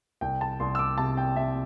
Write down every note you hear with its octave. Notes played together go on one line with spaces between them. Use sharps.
C2 G5
A5
C2 C6
E6
D6
C3 A5
G5
C3 E5